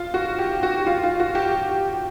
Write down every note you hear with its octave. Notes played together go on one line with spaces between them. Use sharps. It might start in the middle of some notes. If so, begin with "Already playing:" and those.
Already playing: F4
F#4
G4
F#4
F4
F4
F#4
G4